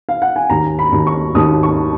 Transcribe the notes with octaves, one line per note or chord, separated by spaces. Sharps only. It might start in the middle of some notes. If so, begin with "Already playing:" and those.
F5
F#5
G#5
D#2 A#5
B5
D#2
C#6
D#2 D#6
C#6